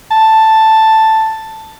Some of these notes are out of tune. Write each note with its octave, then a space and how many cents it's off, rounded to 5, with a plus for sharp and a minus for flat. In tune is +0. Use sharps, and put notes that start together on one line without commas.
A5 +5